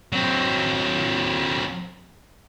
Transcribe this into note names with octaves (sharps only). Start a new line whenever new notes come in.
F#3 C4